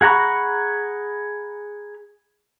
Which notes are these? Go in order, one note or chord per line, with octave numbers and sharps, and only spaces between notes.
G#4 F#5 A#5 B5 C#6